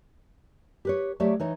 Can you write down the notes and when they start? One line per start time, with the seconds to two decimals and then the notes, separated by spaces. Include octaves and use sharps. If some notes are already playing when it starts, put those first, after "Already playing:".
0.85 G4 B4 C#5
1.20 F#3 A3 G4 C#5 D5
1.40 E3 D#4 C#5